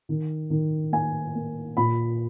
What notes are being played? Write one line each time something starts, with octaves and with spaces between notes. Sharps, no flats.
D#3
D#3
A#3 G#5
A#3
A#2 B5